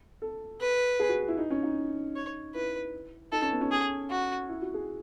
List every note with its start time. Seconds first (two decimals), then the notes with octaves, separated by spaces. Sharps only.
0.22 A4
0.61 B4
1.00 G#4
1.09 F#4
1.28 E4
1.38 D#4
1.50 C#4
1.63 D#4
2.16 C#5
2.54 E4 B4
3.32 D#4 A4
3.42 C#4
3.51 B3
3.61 C#4
3.71 G#4
4.10 F#4
4.49 E4
4.62 F#4
4.74 G#4